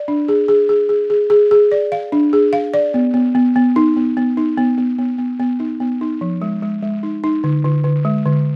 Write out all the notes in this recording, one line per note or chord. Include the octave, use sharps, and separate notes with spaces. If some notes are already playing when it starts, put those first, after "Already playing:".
Already playing: D5
D4
G#4
G#4
G#4
G#4
G#4
G#4
G#4
D5
F5
D4
G#4
F5
D5
B3
B3
B3
B3
D#4
B3
B3
D#4
B3
B3
B3
B3
B3
D#4
B3
D#4
F3
G#3
G#3
G#3
D#4
D#4
D3
D3
D3
G#3
D3